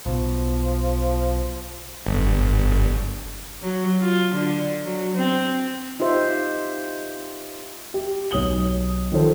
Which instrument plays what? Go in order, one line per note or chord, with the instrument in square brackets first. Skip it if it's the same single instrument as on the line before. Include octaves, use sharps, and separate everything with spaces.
[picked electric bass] B1 B2 [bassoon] F3
[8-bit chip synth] G1
[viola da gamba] F#3
F4
D3
F#3
C4
[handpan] D#4 F4 G4 C5 E5
[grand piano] G4
B1 C#5 D#6 F#7 G7
D#3 F3 A4 C5